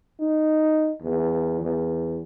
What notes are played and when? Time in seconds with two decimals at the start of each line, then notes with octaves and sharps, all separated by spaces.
0.19 D#4
1.02 E2
1.61 E2